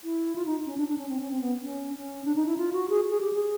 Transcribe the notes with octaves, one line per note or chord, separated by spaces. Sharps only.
E4
F4
D#4
C#4
D4
D4
C#4
C4
C#4
C4
B3
C#4
C#4
D4
D#4
E4
F4
F#4
G#4
G#4
G4
G#4